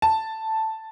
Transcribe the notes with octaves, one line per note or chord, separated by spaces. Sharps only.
A5